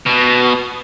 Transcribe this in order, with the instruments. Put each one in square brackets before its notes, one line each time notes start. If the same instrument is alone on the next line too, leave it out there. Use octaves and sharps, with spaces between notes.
[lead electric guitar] B2